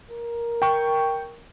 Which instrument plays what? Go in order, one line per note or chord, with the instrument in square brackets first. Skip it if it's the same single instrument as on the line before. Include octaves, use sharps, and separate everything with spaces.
[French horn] A#4
[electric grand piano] G5 C#6